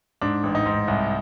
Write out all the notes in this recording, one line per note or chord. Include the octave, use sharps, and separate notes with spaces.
G#2 D4
A1
D#4
G#2
C2